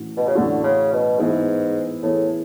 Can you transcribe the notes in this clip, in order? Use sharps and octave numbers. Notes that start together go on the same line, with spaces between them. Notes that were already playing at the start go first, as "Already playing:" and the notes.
Already playing: A2 E3 C#4 F#4
B2
C#3
A2 D3 E3 A3 C#4 F#4
C#3
B2
G#2 E3 B3 E4 G#4
A2 E3 B3 E4 G#4